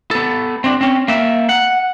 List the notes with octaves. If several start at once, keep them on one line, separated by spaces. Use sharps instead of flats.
B3 A4
C4 D4
C4 C#4
A#3 E5
F#5